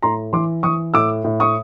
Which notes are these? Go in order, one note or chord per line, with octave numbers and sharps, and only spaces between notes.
A2 A#5 C6
E3 C6 D6
E3 C#6 D#6
A2 D6 E6
A2
C#6 D#6